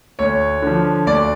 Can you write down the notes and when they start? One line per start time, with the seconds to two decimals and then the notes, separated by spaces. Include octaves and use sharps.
0.19 D2 C#5
0.62 D3 F3
1.06 D2 D5